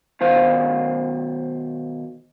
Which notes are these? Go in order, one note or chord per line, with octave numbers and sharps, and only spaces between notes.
B2 D#3 C5 F5